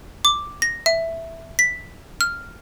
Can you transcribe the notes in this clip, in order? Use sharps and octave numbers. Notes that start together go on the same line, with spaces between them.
D6
A#6
E5
B6
F6